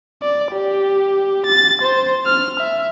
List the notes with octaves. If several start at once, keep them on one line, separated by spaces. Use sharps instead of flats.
D5
G4
A6
C5
F6
E5